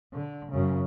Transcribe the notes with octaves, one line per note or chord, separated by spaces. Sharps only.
D3
F#2 C#3